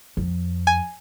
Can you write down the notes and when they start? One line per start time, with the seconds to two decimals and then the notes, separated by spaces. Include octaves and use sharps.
0.17 F2
0.67 G#5